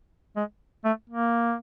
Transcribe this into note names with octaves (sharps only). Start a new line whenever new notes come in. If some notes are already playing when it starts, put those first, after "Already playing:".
G#3
A3
A#3